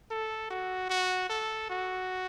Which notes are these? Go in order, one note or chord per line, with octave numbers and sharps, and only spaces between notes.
A4
F#4
F#4
A4
F#4